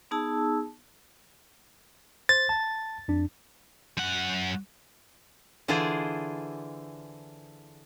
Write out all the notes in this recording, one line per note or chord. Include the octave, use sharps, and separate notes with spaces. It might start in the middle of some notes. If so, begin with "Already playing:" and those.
B3 D#4 G#4 A5 E6
C5 A6
A5
F2 D4
F#2 F#5
D3 E3 F4 G#4 C5 D5